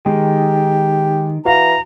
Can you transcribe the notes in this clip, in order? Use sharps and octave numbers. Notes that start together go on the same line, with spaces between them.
D#3 G#3 G4
E3 F#4 F5 A#5